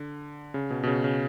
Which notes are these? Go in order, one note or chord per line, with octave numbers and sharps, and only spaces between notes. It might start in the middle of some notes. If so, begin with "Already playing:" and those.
Already playing: D3
C#3
B2
B2
C#3
C#3